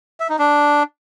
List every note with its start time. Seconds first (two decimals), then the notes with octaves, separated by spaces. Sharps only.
0.20 E5
0.29 D#4
0.39 D4